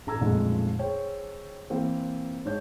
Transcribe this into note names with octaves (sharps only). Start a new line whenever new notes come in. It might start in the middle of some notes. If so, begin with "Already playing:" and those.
A1 A4 A#5 E6 G#6
B1 F2 A#2 D3 G#3 A3
G#4 C5 C#5 G5
E3 A#3 C4
G#2 D4 C#5 G6